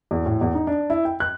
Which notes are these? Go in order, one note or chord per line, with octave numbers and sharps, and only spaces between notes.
E2
A2
E2
D#4
D4
E4
G5
F#6